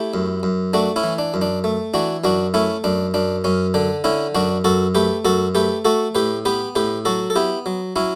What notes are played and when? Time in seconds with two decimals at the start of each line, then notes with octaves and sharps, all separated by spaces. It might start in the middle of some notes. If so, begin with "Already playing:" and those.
Already playing: A3 E4 G4
0.14 F#2
0.43 F#2
0.73 A3 D4 F#4
0.96 C#4 E4
1.03 E3
1.18 D4
1.34 F#2
1.42 D4
1.64 A3
1.94 E3 D4 F#4
2.24 F#2 D4 F#4
2.54 A3 C#4 E4
2.84 F#2 D4
3.14 F#2 D4
3.44 F#2 C#4
3.74 D3 D4
4.04 D3 C#4 E4
4.35 F#2 D4 F#4
4.64 F#2 F#4 A4
4.95 A3 G4 B4
5.25 F#2 F#4 A4
5.55 A3 G4 B4
5.85 A3 F#4 A4
6.15 A2 G4 B4
6.45 B3 G4 B4
6.75 A2 G4 B4
7.05 F#3 F#4 A4
7.30 A4
7.36 B3 E4 G4
7.66 F#3
7.96 F#3 C#4 E4